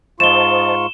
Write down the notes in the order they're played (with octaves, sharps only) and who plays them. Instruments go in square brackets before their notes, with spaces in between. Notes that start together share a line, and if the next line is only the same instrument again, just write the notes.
[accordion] G#2 F4 C#6 [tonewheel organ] C5 D#5 A5 [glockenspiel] E7 G7